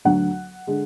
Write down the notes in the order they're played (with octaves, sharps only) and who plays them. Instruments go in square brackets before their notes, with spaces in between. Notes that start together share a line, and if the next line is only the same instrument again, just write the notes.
[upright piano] D2 D3 F#3 F#5
D3 G#3